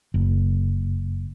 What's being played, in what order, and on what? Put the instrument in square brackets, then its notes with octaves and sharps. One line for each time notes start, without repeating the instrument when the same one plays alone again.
[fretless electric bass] F#1